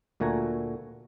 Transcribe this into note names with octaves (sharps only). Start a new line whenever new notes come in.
D2 A#2 A3 F#4 G#5 A#5